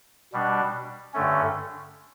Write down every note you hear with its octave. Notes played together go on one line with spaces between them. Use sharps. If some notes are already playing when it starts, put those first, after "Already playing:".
B2 G3 D4
G2 D3 A3 C#4